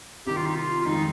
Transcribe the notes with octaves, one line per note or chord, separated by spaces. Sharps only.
C2 C3 D#3 G4
F4
D#4
F4
F4
F2 D#3 G#3 D#4